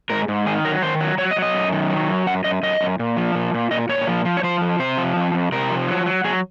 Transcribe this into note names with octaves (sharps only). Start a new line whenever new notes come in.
G#2 A#4
G#2
D#3 G#4
F#3 A#4
D#3 C5
F#3
F#3 C#5
D#5
F#3
D#5
F#2
D#3
F#3
F#2
F#2 F#5
F#2 D#5
F#2 D#5
F#2
A#2
F3
A#2
A#2
A#2 D#5
A#2 C#5
F3
F3
C#5
F3 C5
F2
C3 C5
F3
F2
F2
C3 A#4
F3
F#3
F#3
F#3 G#4